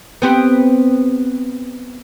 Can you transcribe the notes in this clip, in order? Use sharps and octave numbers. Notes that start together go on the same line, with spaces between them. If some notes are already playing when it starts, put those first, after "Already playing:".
B3 C4 G4